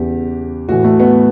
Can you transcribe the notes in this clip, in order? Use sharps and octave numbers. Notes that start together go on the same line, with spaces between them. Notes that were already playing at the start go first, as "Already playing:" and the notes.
Already playing: E2 C#3 E3 G4
A2 E3 F#4
A3
B3